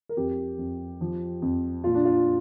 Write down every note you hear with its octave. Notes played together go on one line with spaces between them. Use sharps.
A#4
F2 G4
F2
F3
F2
A#2 F4
D4
F4